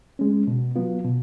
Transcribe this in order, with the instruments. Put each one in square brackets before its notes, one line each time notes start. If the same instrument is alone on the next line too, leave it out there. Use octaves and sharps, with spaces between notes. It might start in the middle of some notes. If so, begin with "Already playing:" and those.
[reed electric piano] G#3 C#4
B2
F#3 B3 F4
B2